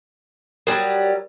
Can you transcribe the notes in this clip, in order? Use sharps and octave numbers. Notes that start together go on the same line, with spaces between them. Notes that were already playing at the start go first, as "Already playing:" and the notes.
F#3 G3 A#4